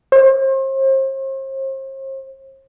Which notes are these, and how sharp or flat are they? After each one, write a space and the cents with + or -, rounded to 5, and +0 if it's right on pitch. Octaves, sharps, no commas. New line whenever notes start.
C5 +40